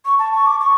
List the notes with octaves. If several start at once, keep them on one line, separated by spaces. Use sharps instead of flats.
C#6
A5
C#6
D6
C#6